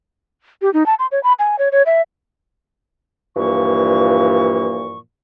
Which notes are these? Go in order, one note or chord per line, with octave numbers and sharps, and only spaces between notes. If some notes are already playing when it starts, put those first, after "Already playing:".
G4
D#4
A5
C6
C#5
B5
G#5
C#5
C#5
E5
G2 A#2 E3 F3 A#3 C#6